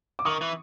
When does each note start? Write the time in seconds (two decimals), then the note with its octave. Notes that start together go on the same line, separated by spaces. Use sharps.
0.19 D6
0.25 D#3 C#6 D#6
0.41 E3